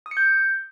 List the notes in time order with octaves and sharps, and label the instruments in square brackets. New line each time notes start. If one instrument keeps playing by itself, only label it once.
[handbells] D#6
C#7
G6